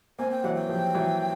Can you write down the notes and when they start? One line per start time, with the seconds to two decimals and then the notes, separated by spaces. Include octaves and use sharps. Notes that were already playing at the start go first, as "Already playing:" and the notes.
0.19 A#3 C4 G#5
0.31 G5
0.43 E3 F#3 F#5
0.55 G5
0.69 F3 G3
0.95 E3 F#3